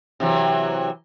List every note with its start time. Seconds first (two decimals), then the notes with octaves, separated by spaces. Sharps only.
0.20 C3 E3 F#3